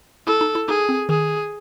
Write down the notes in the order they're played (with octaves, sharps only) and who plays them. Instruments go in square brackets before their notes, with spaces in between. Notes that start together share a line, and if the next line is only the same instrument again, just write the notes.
[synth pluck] E4 [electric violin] A4
[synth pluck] D#4
E4
[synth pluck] D#4 [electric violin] G#4
[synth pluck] C4
[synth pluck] D#3 [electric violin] G#4